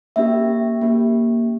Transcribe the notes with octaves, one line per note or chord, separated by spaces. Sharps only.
A#3 C#4 G4 E5
A#3 C#4 G4